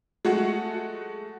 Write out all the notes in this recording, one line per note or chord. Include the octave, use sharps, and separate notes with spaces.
G#3 A3 F#4 F#5